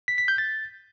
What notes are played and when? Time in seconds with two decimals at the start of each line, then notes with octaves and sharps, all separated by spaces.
0.08 B6
0.18 B6
0.28 G6
0.38 A6